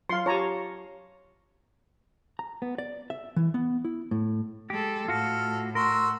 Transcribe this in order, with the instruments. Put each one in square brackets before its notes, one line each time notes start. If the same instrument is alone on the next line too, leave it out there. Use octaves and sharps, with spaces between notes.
[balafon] F#3 F4 [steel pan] F5 C6
[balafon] F4 G4 [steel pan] C#5 A5 A#5
[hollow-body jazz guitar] A#5
B3
D5
E5
E3
B3
E4
A2
[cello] G#3 A4 [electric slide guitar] G4
[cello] A2 [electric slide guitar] F4 F#4 [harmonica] A4 F6
[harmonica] F#4 C6 E6 [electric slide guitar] A#4